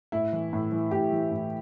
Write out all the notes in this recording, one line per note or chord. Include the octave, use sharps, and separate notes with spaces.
A2 E4
E3
A2
E3
A2 G4
E3
A2